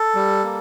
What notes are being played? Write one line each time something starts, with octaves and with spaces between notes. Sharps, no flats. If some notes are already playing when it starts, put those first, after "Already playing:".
Already playing: A4
G3
A#3